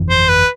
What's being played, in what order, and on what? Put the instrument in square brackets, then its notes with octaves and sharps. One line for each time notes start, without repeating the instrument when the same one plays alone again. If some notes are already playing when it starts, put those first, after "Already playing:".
Already playing: [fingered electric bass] G1 F2 E3
[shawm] C5
B4